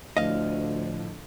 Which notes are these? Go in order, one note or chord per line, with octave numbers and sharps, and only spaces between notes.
D2 A2 D3 F3 D#5 F5